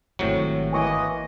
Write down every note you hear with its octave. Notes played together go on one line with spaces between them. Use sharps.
D#1 G#1 A2 C3 F#3
E3 A#3 D#5 G#5 C#6 D6